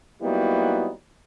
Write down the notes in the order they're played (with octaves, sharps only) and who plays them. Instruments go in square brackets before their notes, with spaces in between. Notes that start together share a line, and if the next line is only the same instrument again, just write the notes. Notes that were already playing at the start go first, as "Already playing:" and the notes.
[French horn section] F#3 G3 A#3 B3 D#4 E4